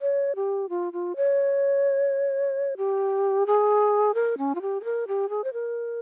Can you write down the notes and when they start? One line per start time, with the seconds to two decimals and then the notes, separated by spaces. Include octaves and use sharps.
0.01 C#5
0.36 G4
0.69 F4
0.93 F4
1.16 C#5
2.77 G4
3.47 G#4
4.14 A#4
4.38 C#4
4.55 F4
4.62 G4
4.81 G#4
4.84 A#4
5.08 G4
5.30 G#4
5.44 C5
5.53 A#4